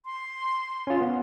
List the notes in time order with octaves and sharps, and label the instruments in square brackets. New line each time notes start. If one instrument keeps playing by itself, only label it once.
[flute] C6
[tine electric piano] C#4 F4
B3